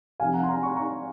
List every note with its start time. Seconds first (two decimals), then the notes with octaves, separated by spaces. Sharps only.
0.20 C3 F3 C4 F5 G#5
0.34 F#5 A#5
0.43 C6
0.48 F#5 A#5
0.62 A#5 C#6
0.76 A#5 C#6